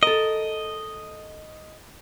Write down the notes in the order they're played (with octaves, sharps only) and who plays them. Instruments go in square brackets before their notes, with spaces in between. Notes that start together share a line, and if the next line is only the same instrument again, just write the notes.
[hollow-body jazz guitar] A4 A#4 [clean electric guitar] D#5